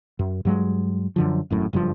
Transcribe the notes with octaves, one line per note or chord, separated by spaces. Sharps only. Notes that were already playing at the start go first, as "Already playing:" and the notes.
F#2
G2 F#3 G#3
F#2 D3 F3
G#1 F#2 A2
F#1 G2 C#3 F3